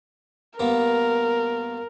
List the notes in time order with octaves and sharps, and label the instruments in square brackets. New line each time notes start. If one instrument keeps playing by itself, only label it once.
[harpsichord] G2 A#3 B3 [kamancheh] A#4